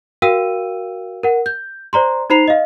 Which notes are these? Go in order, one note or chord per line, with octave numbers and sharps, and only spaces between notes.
F#4 A#4 F5 G5 E6 D#7
A#4 F#5
G6
C5 D5 A#5 C6
D#4 C5 A#5 B5 C7 F7
D#5 F5